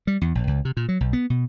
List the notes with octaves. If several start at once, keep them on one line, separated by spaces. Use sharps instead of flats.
G3
E2
A#1
C#2
C3
A#2
F#3
B1
B3
B2